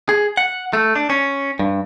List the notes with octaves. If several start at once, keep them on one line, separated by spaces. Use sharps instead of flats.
G#4
F#5
A3
D4
C#4
G2